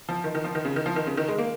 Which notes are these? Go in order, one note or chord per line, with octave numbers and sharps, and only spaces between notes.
F3
D#3
D#3
F3
D#3
C#3
D#3
F3
D#3
C#3
D#3
G#3
A#3